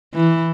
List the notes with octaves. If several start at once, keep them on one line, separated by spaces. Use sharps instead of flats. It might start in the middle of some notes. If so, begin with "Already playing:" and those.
E3